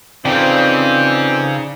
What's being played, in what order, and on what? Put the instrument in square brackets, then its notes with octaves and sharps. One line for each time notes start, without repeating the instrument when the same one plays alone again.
[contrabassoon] F2 [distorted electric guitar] C#3 [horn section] E3 C4 [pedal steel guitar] D#4 D5 G5